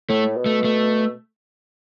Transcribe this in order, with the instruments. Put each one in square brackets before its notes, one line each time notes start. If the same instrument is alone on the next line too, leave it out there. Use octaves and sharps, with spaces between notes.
[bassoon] A2 [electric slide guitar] A3
[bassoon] B2
[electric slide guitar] A3
A3